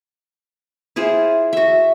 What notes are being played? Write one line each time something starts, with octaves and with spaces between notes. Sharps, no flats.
E4 F4 G#4 C5
F#4 E5